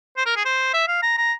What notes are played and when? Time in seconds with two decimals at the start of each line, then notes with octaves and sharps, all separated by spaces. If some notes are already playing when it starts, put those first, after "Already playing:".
0.17 C5
0.26 A#4
0.36 G#4
0.45 C5
0.74 E5
0.88 F5
1.02 A#5
1.18 A#5